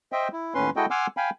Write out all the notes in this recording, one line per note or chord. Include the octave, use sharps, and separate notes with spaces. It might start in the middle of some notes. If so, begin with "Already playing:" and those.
C5 D#5 E5 G5
E4
D#2 A2 C#4 B4 C6
G#3 E4 F#4 A4 D#5 G5
F#5 G#5 C6 D6 E6 F6
F5 G5 G#5 B5